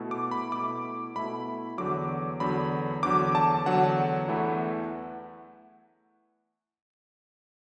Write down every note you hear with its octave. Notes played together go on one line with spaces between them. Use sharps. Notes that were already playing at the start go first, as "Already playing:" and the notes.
Already playing: B2 A3 E4
D6
B5
B2 A3 E4 D6
B2 A3 E4 B5
E2 D3 F#3 D6
E2 D3 F#3 B5
E2 D3 F#3 D6
A5
E2 D3 F#3 F#5
E2 E3 A3 E4